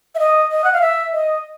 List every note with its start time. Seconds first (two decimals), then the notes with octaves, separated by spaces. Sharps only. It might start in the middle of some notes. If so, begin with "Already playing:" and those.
0.15 E5
0.19 D#5
0.51 D#5
0.64 F#5
0.73 F5
0.81 E5
1.13 D#5